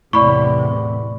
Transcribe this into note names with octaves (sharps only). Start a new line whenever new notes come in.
E2 A2 C3 D5 B5 C#6